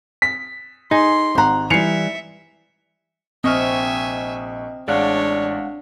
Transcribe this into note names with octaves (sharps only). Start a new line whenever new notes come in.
B6
D#4 G#4 C6
G#1 G4 F#5 A#5
E3 G3 E5 C7 C#7 F7
A#1 C4 D#5 E5 G#5 C#6 F6
A1 G#3 D4 C#5 D5 F5 F#5